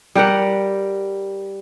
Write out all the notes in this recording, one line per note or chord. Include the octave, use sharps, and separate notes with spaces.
G3 G4 A#4 F#5